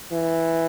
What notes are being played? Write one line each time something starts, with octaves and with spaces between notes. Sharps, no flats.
E3